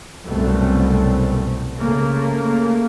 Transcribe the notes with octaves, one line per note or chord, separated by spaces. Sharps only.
F#1 C2 F#2 B2 A3 C4
C#3 A3 A#3